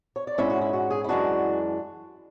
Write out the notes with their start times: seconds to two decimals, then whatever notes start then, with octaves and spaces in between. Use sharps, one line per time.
0.16 C#5
0.27 D5
0.38 G#2 G#3 C#4 E4 E5
0.50 F#4
0.61 E4
0.73 F#4
0.91 G#4
1.04 E4
1.09 F#2 E3 G#3 D4 F#4